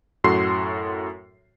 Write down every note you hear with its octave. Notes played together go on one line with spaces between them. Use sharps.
F#2 A2 F#4 A4 C6 C7